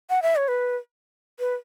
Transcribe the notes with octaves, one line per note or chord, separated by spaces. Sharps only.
F#5
E5
C#5
B4
B4